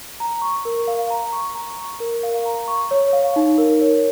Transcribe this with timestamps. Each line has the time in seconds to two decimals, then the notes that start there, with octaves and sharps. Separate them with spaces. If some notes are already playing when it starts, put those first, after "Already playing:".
0.20 A#5
0.42 C#6
0.65 A#4
0.88 F5
1.10 A#5
1.32 C#6
1.55 A#5
1.78 C#6
2.00 A#4
2.23 F5
2.46 A#5
2.68 C#6
2.91 C#5
3.13 F5
3.36 D#4
3.58 A#4
3.81 C#5